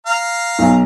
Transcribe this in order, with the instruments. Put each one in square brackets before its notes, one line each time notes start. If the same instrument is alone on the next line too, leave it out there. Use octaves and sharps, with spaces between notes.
[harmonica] F5 A#5
[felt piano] B1